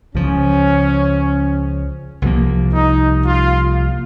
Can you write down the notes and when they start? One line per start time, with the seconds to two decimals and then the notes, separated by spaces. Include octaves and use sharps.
0.14 C#2 C#3 F3 C#4
2.22 C2 C3 F3 A#3
2.74 D#4
3.26 F4